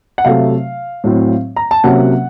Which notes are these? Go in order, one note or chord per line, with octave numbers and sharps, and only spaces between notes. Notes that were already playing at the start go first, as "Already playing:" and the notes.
F#5
C3 F#3 A3 F5
A2 F#3 C4
A#5
A5
C3 F#3 A#3 C#4 F#5